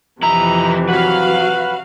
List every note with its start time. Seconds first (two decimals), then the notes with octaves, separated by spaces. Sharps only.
0.23 F2 C3 E3 D#4 E4 A#5
0.89 F#3 F#4 B4 F5